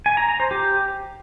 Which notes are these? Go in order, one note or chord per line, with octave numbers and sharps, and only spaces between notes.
G#5
A#5
A#5
C5
G4